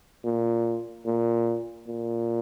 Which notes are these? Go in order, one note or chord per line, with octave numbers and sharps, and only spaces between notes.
A#2
A#2
A#2